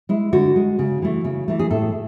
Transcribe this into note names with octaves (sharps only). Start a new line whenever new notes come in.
G#3 E4
D3 F#4
G#3
C#3
E3 A3
C#3
E3 A3
G#4
A2 A4